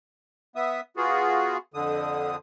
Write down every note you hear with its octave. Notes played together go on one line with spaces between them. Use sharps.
B3 E5 D#6
B3 F4 F#4 G#4
F2 D3 D#6